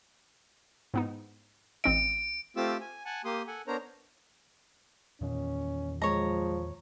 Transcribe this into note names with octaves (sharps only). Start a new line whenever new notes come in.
G#2 B3 D#4
A1 C4 D#5 D7
A3 C4 F4 G4 D6 E6
G#5
F#5 G#5 A5
A#3 G4 C6 D#6
A4 F#5 G#5
B3 D4 A#4 C5 C#5 A#5
E2 A#2 D#3 C#4
F3 G#3 C#5 A#5